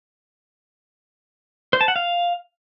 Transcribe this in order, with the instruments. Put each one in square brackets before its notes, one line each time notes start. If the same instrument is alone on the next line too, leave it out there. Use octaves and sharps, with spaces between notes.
[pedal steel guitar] C5
A5
F#5
F5